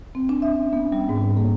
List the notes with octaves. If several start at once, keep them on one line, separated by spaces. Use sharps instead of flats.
C4
D4
E5
C#4
B3
G3
G#2
A#3